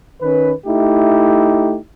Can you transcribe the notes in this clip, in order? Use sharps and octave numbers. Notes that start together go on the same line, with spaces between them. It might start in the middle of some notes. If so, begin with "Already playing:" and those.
D#3 C#4 B4
A3 D#4 E4 G4